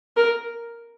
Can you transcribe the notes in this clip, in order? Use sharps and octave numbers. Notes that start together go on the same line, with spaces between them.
A#4